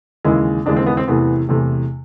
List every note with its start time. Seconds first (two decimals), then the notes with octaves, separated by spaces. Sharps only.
0.25 D#2 C#3 E3 G#3 E4
0.66 D#2 C#3 E3 G#3 D4
0.76 C4
0.86 B3
0.97 C4
1.07 E2 C3 E3 A3 B3
1.49 E2 C3 E3 A3